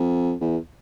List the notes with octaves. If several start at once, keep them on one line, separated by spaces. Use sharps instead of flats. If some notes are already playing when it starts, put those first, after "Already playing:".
Already playing: F2
E2